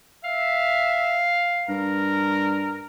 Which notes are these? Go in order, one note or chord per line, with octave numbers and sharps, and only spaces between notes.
E5 F5
G2 A#4